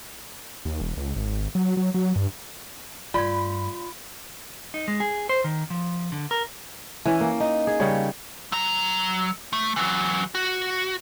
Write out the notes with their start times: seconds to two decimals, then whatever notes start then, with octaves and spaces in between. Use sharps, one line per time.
0.65 D#2
0.81 E1
0.97 C#2
1.16 G#1
1.55 F#3
1.77 F#3
1.94 F#3
2.16 G2
3.14 G2 A3 F4 D5 B5 G#6
4.74 D#4
4.88 G#3
5.00 G#4
5.29 C5
5.44 D#3
5.70 F3
6.12 D3
6.31 A#4
7.05 E3 C#4
7.21 A#3
7.40 D#4
7.67 G#4
7.80 C#3 G3 C#5
8.52 F#3 A#5
9.53 A3
9.76 E3 F#3
10.35 F#4